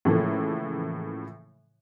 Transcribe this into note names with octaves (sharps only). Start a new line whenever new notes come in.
A2 C#3 E3 F3 A3 A#3